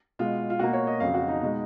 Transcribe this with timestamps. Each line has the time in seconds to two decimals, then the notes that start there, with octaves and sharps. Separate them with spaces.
0.19 B2 G#3 F4
0.50 F4
0.59 B2 A#3 F#4
0.73 C#5
0.87 D#5
1.00 F2 C#3 F#3 F5
1.14 F#4
1.28 D#4
1.41 B2 G#3